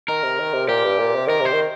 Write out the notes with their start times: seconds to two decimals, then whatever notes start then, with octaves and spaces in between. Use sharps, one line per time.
0.08 D#3 A#4
0.23 C3
0.39 D#3
0.53 C3
0.68 A#2 G4
0.84 G2
0.99 A#2
1.15 C3
1.27 D#3 A#4
1.41 C3 C5
1.53 D#3